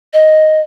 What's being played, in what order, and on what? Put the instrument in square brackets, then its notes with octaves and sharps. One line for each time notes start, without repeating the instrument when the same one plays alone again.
[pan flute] D#5